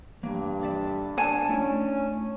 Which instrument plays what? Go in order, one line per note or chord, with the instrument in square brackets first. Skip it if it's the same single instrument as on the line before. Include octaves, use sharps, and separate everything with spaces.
[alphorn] G2 [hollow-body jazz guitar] E3 A#3
[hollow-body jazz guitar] D3 D5 E5
[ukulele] D4 G#5 A5
[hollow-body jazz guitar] A3 E4 [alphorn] C#4